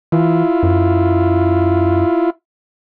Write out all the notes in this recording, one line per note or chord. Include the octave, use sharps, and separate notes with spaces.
E3 E4 F4
F#2